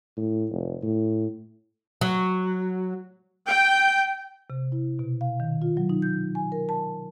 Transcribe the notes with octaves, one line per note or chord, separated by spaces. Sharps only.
A2
F1
A2
F#3
G5
C3
E4
B2
F5
D#3
F4
F#3
D#4
G6
G#5
A#4
A5